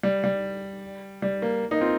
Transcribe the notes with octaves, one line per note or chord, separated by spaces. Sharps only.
G3
G3
G3
A#3
A#3 D#4
C4 F4